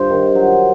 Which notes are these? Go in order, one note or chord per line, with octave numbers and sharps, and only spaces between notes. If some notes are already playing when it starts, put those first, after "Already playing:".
Already playing: G2 C5
D#3
F#3